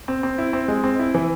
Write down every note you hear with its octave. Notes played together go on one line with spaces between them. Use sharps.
C4
C4
E4
C4
G#3
C4
E4
E3